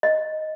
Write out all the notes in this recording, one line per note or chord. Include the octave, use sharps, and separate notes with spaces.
D#5